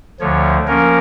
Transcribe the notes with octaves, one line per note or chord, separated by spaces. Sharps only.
D2 D3 F3 C#5
F3 A#3 C#4 A#4